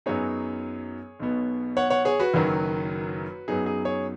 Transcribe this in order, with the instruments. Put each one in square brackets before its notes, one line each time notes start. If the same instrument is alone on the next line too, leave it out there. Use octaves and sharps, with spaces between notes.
[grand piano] F#2 F#3 B3 D#4 G#4 C#5
B1 B2 B3
C#5 F#5
C#5 F#5
G#4 C#5
F#4 B4
F#1 F#2 D#3 F#3
F#2 F#3 B3 D#4 G#4
G#4
G#4 C#5